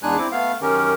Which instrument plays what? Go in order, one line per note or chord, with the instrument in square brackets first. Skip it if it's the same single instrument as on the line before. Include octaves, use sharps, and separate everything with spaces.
[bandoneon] E2 G#3 D4 D#4 G#5 F#6
C4 E4 D6
A3 B3 F5
F#2 D#3 C#4 G4 A#4